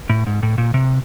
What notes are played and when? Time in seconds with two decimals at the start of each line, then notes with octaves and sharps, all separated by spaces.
0.10 A2
0.27 G#2
0.43 A2
0.58 A#2
0.74 C3